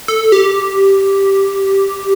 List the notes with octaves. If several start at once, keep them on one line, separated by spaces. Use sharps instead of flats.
A4
G4